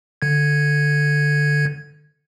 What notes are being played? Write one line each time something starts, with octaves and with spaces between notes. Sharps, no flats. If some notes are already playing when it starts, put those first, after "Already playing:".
D3 G#6